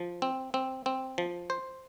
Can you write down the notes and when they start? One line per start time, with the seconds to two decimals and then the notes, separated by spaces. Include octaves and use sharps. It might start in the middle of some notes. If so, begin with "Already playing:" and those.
Already playing: F3
0.22 C4
0.54 C4
0.86 C4
1.18 F3
1.50 C5